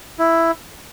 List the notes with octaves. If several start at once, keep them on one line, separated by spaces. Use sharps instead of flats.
E4